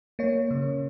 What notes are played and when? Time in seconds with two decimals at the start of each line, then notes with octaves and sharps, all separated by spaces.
0.19 A#3 C#5
0.51 C#3